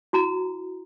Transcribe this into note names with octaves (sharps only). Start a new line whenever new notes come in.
E4 F#4 A#5